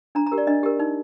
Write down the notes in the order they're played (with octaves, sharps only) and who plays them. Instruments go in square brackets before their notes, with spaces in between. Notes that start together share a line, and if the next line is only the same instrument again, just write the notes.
[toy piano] D4 A#5
A#5
G4 A#4
D5
D4 D#5
G4 A#4
D#4